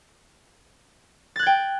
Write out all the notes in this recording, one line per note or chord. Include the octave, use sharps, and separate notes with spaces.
G5 F#6 G#6 A6